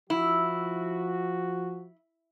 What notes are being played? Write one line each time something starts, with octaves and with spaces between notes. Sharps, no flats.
F3 E4 F#4